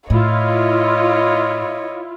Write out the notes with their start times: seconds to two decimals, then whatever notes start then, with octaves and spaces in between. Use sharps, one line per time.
0.10 A2 E4 F4 C#5 D#5